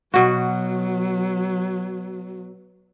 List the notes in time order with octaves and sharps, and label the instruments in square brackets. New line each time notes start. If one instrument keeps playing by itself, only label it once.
[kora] B2 F#4 [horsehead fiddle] F#3